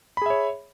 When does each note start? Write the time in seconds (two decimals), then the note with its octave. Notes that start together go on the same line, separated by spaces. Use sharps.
0.17 B5
0.22 G#4
0.26 E5
0.30 C#5